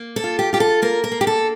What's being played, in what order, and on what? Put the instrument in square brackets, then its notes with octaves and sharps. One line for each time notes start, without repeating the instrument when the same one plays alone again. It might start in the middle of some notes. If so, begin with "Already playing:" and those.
Already playing: [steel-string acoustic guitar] A#3
A4
F4
G4
F4 G4
A4
A#3 A#4
A#4
A#3
G4
A4